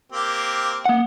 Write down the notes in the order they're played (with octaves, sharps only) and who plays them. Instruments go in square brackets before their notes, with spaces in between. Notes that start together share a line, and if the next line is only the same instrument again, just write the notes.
[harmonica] A#3 C4 G4
[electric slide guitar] A#3 F#5